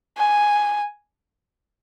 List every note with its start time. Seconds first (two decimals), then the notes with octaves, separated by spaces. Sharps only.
0.18 G#5